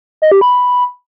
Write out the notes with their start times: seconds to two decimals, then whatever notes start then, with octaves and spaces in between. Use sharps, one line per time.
0.22 D#5
0.32 G4
0.41 B5